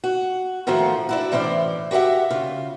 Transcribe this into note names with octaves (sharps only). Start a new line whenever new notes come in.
F#4
A2 D#3 F3 A3 F4 F#4
D4 E4 F#4
A2 E3 C#4 C5 D5
F#4 G4 C#5 E5 F#5
C#3 F4